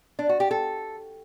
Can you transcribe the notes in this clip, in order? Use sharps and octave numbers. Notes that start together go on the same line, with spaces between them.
D4
F#4
G4
A4